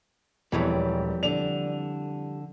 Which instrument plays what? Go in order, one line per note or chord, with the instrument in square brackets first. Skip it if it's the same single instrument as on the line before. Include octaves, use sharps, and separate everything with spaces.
[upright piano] E1 [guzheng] F2 C#5 B5 [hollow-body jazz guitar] E3 G3
[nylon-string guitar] D3 D5 [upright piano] F7